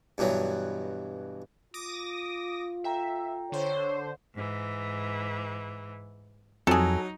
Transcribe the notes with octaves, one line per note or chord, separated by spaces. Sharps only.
G2 B2 E3 F#3
F4 D6 D#6 A#6
A4 E5 G5 A#5
D3 C5 C#5
G#2 E3
F2 F#3 D#4 G#4 A4